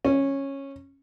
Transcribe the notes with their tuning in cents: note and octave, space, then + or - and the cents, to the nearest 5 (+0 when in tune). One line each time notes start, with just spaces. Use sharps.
C#4 -10